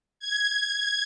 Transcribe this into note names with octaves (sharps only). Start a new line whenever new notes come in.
G#6